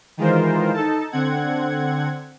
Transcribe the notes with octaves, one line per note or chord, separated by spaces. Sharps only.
D#3 E3 G#3 F4 A#4 C5
D#4 A4 A5
D3 C4 F#5 G#6